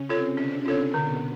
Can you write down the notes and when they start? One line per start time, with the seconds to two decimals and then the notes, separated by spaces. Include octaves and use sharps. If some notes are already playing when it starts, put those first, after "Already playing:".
Already playing: C#3 C#4
0.09 C3 C4 F4 A4 C#5
0.37 D3 C#4 D4
0.66 C#3 C#4 F4 A4 C#5
0.94 B2 D3 B3